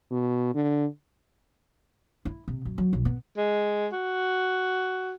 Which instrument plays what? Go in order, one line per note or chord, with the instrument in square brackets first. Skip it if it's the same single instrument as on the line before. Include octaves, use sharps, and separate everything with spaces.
[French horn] B2
D3
[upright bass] E4
C3
F#2
F#3
B1
B3
[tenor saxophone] G#3
F#4